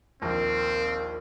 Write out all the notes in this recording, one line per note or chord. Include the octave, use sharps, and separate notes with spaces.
A#1 D#2 C4 A#4